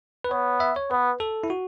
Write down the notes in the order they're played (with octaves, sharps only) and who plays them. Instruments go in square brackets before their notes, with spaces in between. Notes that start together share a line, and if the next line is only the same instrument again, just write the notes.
[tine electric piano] B4
[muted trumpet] B3 [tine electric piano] C#5
[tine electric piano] E5
C#5
[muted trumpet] B3 [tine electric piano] B4
[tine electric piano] A4
E4
F#4